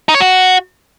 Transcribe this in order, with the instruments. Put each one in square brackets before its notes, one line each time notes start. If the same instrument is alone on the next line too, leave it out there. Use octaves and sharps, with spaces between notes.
[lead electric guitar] D#4
C#5
F#4